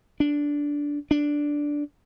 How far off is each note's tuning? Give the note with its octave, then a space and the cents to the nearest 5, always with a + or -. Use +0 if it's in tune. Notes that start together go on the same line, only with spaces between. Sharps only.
D4 -10
D4 -5